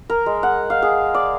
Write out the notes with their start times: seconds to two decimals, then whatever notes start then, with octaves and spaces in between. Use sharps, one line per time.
0.10 A#4
0.26 G#3
0.43 F#5
0.70 F5
0.82 G#4
1.14 D5